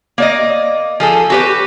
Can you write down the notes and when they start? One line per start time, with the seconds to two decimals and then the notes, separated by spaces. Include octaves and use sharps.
0.18 A#3 D5 D#5
1.00 F3 G#4 A4
1.30 F#4 G4 B4